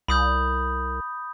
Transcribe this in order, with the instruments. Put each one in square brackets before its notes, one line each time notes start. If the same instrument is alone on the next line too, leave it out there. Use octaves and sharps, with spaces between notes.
[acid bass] C2 [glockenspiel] B5 D#6 G6